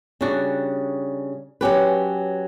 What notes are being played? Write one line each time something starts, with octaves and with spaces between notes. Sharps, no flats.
C#3 G3 D4 F#4
F#3 C#4 G4 B4